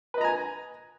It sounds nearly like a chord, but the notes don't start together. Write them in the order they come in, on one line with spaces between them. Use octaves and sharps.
B4 D#5 A#5 G#5